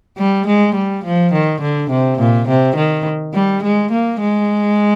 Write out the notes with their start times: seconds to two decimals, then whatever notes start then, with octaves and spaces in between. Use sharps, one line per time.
0.18 G3
0.47 G#3
0.75 G3
1.04 F3
1.33 D#3
1.61 D3
1.90 C3
2.19 A#2
2.48 C3
2.76 D#3
3.34 G3
3.63 G#3
3.92 A#3
4.20 G#3